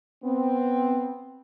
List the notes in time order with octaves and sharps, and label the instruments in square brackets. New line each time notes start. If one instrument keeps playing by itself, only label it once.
[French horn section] B3 C4